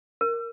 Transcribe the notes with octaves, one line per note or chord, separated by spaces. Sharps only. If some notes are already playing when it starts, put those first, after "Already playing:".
A#4